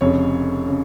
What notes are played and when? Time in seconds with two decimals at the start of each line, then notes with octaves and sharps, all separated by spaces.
0.01 F1 F2 C#3 C#5
0.67 C#3